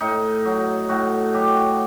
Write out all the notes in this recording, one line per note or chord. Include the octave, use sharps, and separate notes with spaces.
A2 D#4
F#3
A2 F#4
F#3 G4
F#4